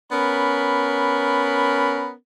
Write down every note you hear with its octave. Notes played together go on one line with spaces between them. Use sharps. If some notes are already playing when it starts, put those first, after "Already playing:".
B3 C#4 A#4 B5